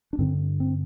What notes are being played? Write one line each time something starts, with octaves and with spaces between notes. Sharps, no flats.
D4
G2 D3 C4
C4